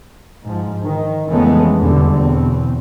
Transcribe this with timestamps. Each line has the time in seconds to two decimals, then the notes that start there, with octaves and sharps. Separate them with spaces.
0.45 G#2 F3
0.81 D#3
1.28 F2 C#3 E3 G#3 A3 B3
1.77 E2 B2 D3 G3
2.13 E2 B2 C4